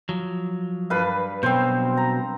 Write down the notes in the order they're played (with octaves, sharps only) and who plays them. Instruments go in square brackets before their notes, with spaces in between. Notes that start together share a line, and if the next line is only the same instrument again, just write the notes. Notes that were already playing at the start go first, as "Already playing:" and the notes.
[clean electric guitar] F3 F#3
[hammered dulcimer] G2 B4 F5
[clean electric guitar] B2 F#3 [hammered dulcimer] C4 C5
[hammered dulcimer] A#5